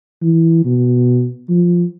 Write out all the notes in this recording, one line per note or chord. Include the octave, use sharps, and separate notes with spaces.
E3
B2
F3